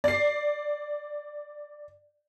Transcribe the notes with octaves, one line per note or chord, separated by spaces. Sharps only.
D5 C7